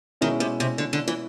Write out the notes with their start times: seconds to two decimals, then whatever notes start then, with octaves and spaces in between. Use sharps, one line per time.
0.21 B2 D#3 G#3 C#4 E4
0.40 C3
0.60 C3
0.78 D3
0.93 D3
1.08 E3